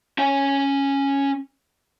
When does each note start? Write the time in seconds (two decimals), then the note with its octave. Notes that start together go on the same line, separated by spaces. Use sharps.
0.18 C#4 G#5